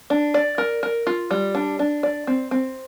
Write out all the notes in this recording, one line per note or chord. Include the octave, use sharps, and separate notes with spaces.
D4
D5
A#4
A#4
F4
G3
D4
D4
D5
C4
C4